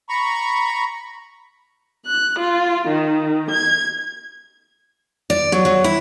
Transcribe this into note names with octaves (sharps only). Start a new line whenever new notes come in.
A#5 B5 C#6
F#6
F4
D#3
G#6
D5
F#3
F#3
E4